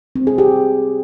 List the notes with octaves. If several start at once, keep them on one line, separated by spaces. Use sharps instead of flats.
C4
G#4
G4